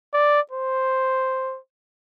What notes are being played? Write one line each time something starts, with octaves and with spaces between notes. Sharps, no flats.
D5
C5